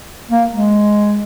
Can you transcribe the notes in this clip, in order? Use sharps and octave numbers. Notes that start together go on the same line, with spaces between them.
A#3
G#3